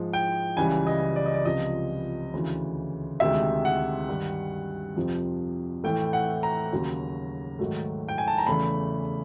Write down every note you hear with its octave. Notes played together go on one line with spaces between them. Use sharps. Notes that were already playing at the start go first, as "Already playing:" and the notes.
Already playing: G#2 F3 G#3
G5
C#2 C#3 E3 G3 G#5
D#5
D5
D#5
D5
C#2 C3 F3 D#5
D2 C#3 E3
D2 C3 D#3 G#3 E5
F#5
G2 D#3 G3
F2 C3 F3
A2 E3 A3 G5
F#5
A#5
D#2 C#3 F#3
G#2 D#3 F#3 A3
G5
G#5
A5
A#5
E2 C#3 E3 A3 B5